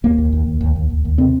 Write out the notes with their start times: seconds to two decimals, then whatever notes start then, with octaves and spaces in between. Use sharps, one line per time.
0.03 D#2 A#3
0.18 D#2
0.33 D#2
0.47 D#2
0.61 D#2
0.76 D#2
0.90 D#2
1.05 D#2
1.18 C3 C4